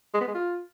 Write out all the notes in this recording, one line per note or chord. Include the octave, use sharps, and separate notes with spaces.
G#3
B3
G#3
F4